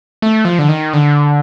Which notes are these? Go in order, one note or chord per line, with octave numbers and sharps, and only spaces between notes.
A3
F3
D3
D#3
D3